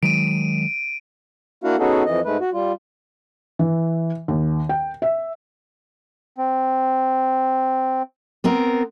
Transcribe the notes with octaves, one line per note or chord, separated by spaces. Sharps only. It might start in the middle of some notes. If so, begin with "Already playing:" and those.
D#3 F#3 G#3 D7 D#7
A#3 D4 E4 F#4 F5 F#5
B3 C#4 D#4 F#4 G#4 A4
F2 E3 D#5
G#2 G#3 A3 B4
F#4
G3 F4
E3
D#2
G5
E5
C4
B3 C4 A#4